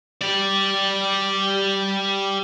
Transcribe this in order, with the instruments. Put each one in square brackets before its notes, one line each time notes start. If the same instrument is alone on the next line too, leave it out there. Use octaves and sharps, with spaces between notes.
[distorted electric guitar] G4 D5